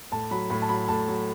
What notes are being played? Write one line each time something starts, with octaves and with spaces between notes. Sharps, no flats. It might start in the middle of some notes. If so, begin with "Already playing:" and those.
A2 A5
F#3 B5
A2 B5
A5
F#3 B5
A2 A5
F#3